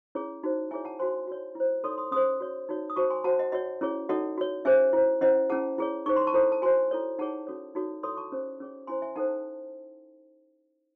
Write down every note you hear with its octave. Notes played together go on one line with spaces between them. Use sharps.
C#4 E4 G#4 C#5
D#4 F#4 C5
E4 G#4 C#5 E5 G#5
F#5 A5
F#4 C5 G#5 C6
F#4 C#5
E4 C5
D#4 A4 C#5 C6 D#6
C6 D#6
C#4 G#4 C5 C6 D#6
F#4 C#5
D#4 F#4 C#5
D#6
F#4 C5 A5 C#6
G#5 C6
F#4 C5 F#5 A5
D#5 F#5
F#4 C#5 D#5 F#5
C#4 E4 G#4 C#5
D#4 F#4 A4 C#5 D#5 F#5
F#4 C#5
C#4 G#4 C5 E5 G#5
E4 C5
C#4 E4 C5 D#5 F#5
C#4 E4 G#4 F#5 A5
E4 G#4 C#5
D#4 G#4 C5 C#6
C6
A5 C#6
E4 A4 C5
A5
F#4 C5 G#5 C6
E4 A4 C#5
D#4 G#4 C#5 F#5 A5
C#4 F#4 A4 C#5
D#4 F#4 A4 C#5
E4 A4 C#5 C6 D#6
A5 C#6
C#4 G#4 C5
C#4 G#4 C#5
C#4 E4 C5 G#5 C6
E5 G#5
D#4 A4 C5 F#5 A5